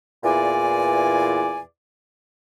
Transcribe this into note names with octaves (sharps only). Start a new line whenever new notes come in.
E2 A#2 E3 D5 G#5